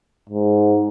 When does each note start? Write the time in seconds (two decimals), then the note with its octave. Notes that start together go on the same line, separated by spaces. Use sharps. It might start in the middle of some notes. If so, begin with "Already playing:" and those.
0.29 G#2